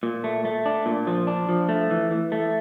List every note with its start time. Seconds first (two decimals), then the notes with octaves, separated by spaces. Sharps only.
0.03 A#2
0.24 A3
0.45 A3
0.66 D4
0.86 A#2
1.07 F3
1.27 D4
1.49 F3
1.69 A3
1.91 E3
2.11 E3
2.32 A3